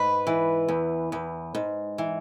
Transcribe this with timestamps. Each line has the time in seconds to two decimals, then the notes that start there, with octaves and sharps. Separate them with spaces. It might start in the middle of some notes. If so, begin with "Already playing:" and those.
Already playing: G#2 B4
0.27 E3
0.68 E2
1.12 E2
1.55 G#2
1.98 E3